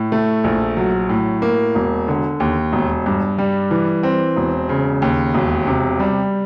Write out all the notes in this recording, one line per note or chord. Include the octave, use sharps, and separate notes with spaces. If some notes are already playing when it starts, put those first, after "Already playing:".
Already playing: A2
A3
A#1
F#3
A2
A#3
E1
D3
D#2
E1
G2
G3
E3
C4
E1
C#3
D#2
E1
C3
G3